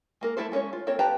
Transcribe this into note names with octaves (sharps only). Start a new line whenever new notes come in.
G#3 A#3 A#4
A3 B3 E4 A4 C5
G#3 C#4 B4 C#5
F4
A#3 C4 A4 C#5
G4 B4 F5 A5 A#5